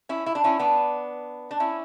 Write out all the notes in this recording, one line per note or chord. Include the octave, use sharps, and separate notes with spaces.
C#4 E4
E4
D4
C#4 E4
B3 D4
D4
C#4 E4